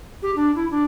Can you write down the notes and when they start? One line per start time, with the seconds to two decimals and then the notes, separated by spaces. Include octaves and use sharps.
0.22 G4
0.36 D4
0.55 E4
0.71 D4